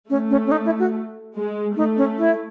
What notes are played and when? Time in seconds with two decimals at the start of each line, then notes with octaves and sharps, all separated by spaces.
0.10 A3 C#4
0.31 C#4
0.47 C#4
0.52 D#4
0.65 E4
0.79 F#4
1.35 G#3
1.76 A3 D#4
1.97 C#4
2.18 E4